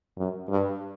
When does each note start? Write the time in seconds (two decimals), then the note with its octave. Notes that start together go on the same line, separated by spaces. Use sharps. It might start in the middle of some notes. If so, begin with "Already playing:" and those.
0.18 F#2
0.50 G2